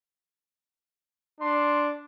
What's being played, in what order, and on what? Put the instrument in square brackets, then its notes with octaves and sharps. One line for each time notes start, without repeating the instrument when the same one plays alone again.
[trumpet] D4 [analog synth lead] C6